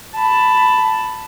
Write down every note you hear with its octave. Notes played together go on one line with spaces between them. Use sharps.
A5 B5